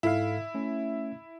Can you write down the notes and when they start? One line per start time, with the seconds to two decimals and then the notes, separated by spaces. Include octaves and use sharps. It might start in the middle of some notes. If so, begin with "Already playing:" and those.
0.03 G#2 E4 A4 F5
0.55 A3 C#4